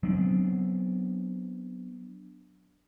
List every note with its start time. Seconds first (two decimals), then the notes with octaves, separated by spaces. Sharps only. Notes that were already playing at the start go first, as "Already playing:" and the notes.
0.03 F#3 B3 C4 D4